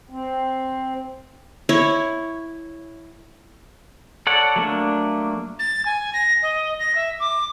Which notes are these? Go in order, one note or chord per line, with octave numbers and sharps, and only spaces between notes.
C4
E4 C#5
A4 C#5 D5 F#5
F#3 A3 A#3 D4
A6
G#5
A#6
D#5
A#6
E5
D6